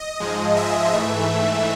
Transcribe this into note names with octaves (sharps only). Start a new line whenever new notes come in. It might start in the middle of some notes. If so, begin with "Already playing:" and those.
Already playing: D#5
G#2 F3 G#3
E5
G#2 E3 A3 E5